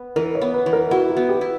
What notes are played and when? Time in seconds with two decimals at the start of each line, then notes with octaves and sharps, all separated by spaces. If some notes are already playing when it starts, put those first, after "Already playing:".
Already playing: B3
0.16 E3 A#4
0.35 C#5
0.41 B3
0.54 B4
0.66 E3
0.73 A#4
0.91 E4 F#4
1.10 F#4
1.17 B3
1.29 G4
1.41 E4